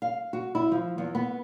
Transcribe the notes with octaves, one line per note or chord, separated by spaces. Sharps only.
F5
F#4
E4
F3
E2
B3